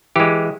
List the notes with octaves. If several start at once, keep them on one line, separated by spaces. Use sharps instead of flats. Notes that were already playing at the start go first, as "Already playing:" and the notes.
E3 G#3 G4